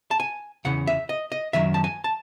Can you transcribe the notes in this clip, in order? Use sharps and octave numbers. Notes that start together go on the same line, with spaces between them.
A5
G#5
E2 C#3 E3 F#5
E5
D#5
D#5
F#2 D#3 F#3 E5
A5
G#5
A5